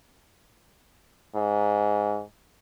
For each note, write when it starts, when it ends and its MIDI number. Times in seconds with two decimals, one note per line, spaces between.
1.35 2.22 44